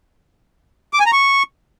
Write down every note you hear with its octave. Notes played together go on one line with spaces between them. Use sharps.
D6
G#5
A#5
C#6